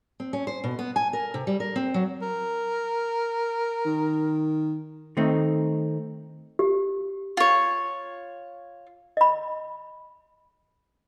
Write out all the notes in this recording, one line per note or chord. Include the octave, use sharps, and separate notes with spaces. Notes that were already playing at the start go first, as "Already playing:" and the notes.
C4
C#4
C5
B2
B3
G#5
A#4
C3
G3
A#4
C4
F#3
A#4
D#3
D#3 A3 C4 D#4
G4
F4 C#5
D#5 B5